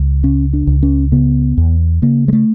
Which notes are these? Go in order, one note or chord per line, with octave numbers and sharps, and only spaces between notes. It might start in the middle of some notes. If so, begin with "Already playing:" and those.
Already playing: C#2
C#3 C#4
D4
C#2
C#4
C#3 B3
E2
C#3 A#3
G#3
A3